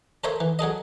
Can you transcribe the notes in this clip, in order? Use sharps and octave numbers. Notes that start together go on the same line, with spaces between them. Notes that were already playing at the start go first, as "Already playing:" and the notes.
A4 A#4 C5 C#5 E5
E3
F#3 G#4 A4 D#5